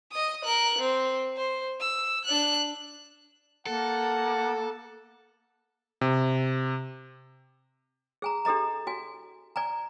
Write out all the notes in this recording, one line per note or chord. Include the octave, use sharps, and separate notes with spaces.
D#5 D#6
A#4 F#6
C4
C5
E6
D4 F#6
A#3 A4 F#5 A5
C3
G#4 G#5 A#5
D4 G4 A4 D#5 A#5
F#4 G#5
D5 G#5 A#5